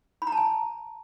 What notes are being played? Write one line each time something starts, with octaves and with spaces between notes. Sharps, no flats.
B5
A#5
A5
G#5